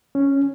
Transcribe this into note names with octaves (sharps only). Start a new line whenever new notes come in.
C#4